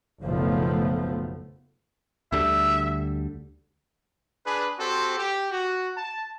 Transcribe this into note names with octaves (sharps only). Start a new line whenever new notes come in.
F#1 B1 F3 A3 B3
D2 D3 G3 E5
D4 G#4 B4
C4 F#4 G4 A4 C5
G4
F#4
A5